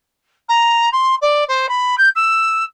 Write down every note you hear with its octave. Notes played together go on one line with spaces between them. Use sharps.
A#5
C6
D5
C5
B5
G6
E6